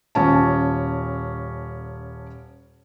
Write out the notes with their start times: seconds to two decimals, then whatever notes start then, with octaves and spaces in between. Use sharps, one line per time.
0.15 D#1 C#4 A5